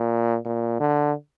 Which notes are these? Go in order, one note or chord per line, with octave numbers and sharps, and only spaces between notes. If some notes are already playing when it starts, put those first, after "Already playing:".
Already playing: A#2
A#2
D3